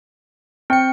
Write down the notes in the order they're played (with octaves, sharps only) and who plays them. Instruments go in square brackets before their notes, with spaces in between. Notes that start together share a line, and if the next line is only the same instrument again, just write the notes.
[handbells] C4 C#7 [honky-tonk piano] G5